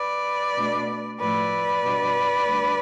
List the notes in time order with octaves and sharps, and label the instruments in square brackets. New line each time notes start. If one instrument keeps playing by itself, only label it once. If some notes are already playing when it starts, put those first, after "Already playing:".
Already playing: [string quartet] B4 D5
B2 A3 D4
A2 F3 A3 E4 B4 D5
B2 G3 D4
D2 D3 G3 D4